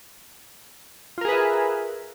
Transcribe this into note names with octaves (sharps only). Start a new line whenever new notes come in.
F4 G#4 A#4 B4 E5